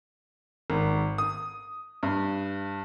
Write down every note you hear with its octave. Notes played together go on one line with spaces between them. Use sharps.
G#1
D#6
G2